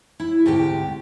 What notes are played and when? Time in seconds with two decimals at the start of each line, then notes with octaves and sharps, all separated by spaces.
0.20 E4
0.46 D2 G#2 C3 G4 G5